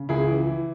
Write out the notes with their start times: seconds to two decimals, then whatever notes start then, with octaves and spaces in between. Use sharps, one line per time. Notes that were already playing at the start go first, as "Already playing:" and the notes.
Already playing: C#3
0.09 C#2 E4 G#4
0.28 E3 E4
0.47 E3